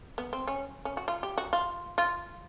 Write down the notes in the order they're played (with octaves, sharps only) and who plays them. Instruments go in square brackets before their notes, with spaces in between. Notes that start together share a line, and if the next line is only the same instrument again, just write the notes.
[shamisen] B3
C4
C#4
C#4
F#4
F4
G4
F#4
F4
F4